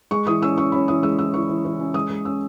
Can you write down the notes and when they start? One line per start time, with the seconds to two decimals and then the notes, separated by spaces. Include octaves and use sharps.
0.11 G#3 C#6
0.27 E3 D#6
0.42 C#4 E6
0.57 C#4 C#6
0.72 C#4 B5
0.88 E3 D#6
1.03 G#3 E6
1.19 E3 E6
1.34 E3 C#6
1.49 E3
1.65 E3
1.80 C#4
1.94 G#3 D#6
2.10 G#3
2.25 C#4 E6